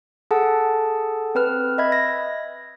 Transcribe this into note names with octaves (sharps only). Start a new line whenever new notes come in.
G#4 A4 F#5 A5
C4 B4 F6
D#5 E5 B5 G#6
A#6